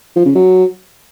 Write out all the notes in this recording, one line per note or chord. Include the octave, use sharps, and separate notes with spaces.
F3
C#3
F#3